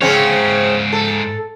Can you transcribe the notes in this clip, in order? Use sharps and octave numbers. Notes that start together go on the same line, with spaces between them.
G#2 C#3 C4 C#5
A4